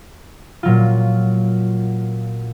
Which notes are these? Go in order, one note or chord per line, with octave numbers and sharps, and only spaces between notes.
A#2 F#3 F4